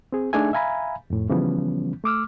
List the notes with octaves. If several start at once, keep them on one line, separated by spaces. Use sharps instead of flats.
C4 G#4
A3 D4 D#4 G#4 E5 G#5
E5 F5 G#5 A#5 B5
F2 A2
C#3 E3 F3 G3 B3 C#4
A3 D6 E6 F6